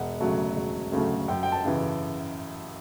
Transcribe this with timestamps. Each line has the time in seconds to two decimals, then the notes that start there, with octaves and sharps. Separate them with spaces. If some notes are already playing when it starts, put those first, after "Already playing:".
Already playing: E1 F#5
0.20 D2 C#3 F#3 A3
0.56 E1
0.92 D2 C#3 F#3 A3
1.28 F#2 G5
1.43 G5
1.52 A5
1.64 C#3 E3